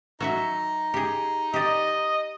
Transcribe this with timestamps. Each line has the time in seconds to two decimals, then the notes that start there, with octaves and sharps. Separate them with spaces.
0.20 F#3 D#4 F#4 E5
0.94 G4 G#4
1.54 G4 D5 D#5